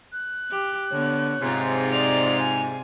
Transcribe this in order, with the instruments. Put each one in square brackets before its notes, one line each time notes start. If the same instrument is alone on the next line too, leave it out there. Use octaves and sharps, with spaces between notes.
[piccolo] F#6
[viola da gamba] G4
[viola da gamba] D3 B3 [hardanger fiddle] C#5
[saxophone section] G#2 [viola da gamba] C3 F4
[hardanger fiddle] D5 [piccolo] F7
[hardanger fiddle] G#5